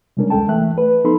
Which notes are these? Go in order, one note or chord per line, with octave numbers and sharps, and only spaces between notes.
C3 G3 G#3 C#4 D4 A#4
D#2 G#3 A4 G5 A5
E3 A3 E5 F#6
B4
F3 B3 D#4 A4 B5 C6